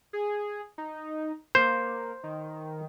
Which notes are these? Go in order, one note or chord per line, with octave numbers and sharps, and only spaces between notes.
G#4
D#4
A#3 C5
D#3